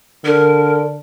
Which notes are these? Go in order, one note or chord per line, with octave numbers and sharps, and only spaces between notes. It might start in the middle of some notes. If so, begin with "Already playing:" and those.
D3 A#4